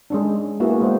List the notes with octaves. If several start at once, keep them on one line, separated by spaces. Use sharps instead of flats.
G#3 C#4 D4
A#3 B3 E4 F#4 G#4
G#3 B3 C5